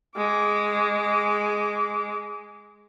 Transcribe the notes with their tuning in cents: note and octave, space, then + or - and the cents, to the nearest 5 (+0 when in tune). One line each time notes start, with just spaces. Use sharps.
G#3 +0 D6 -25